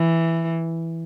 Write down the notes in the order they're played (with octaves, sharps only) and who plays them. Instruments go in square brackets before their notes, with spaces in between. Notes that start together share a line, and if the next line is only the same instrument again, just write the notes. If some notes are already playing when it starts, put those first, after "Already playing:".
Already playing: [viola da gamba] E3